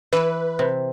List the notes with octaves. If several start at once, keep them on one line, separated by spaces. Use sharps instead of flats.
E3 B4
C3